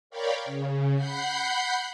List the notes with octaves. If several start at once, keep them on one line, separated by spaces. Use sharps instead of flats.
A#4 C#5 D5 F5 G5 B5
C#3
F#5 B5 G6 C7